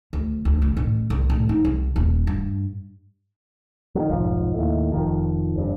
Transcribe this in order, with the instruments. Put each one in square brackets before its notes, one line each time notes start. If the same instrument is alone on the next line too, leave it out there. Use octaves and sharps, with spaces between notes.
[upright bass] D2
D2
C#2
A1
C2
A1
D#4
C2
D#1
G2
[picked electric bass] D#3 F#3
F1 B1 G#2 F3
D#2 A2
F1 D#3 F3
F1 G2